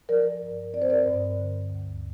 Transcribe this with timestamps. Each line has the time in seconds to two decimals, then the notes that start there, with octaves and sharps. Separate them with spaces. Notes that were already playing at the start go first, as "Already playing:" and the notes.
0.09 F3 A#4 D5
0.42 G2
0.73 C4 D5
0.82 C5
0.90 A#4 D5
1.06 G2
1.37 D3
1.70 D2